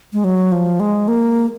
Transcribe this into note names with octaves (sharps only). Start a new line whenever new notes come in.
G#3
F#3
F3
G#3
A#3